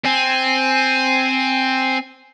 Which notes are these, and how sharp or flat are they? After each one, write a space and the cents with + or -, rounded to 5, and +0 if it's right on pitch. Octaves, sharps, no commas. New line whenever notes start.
C4 +0 G#5 +0